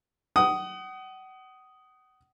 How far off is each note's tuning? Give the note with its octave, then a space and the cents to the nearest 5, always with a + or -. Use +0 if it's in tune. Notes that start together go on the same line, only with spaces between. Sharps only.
F#5 +35 D#6 +0